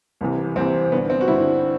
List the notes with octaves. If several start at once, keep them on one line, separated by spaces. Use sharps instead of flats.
C2 C3 E3
C2 C3 E3 C4
G2 D3 B3
C4
F#4
G2 D3 E4